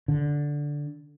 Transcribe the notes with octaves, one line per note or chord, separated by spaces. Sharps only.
D3